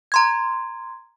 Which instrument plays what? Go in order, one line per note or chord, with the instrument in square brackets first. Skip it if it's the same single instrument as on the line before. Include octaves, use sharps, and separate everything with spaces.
[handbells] A#5 C6 G#6